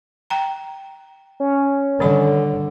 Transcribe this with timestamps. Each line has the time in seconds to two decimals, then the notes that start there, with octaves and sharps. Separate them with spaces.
0.30 G5 A#5
1.40 C#4
2.00 D3 D#3 G3 B5